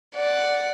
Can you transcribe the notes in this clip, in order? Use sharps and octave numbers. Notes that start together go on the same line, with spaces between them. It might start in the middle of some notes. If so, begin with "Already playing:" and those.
D5 F#5